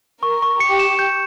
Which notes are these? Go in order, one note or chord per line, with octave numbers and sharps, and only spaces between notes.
A#4 C#6
C#6
G4 C#7
E7
G6